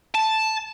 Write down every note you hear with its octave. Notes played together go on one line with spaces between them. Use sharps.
A5